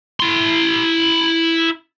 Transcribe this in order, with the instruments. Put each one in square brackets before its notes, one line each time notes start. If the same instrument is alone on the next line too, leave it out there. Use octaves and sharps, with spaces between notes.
[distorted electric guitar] E4 C6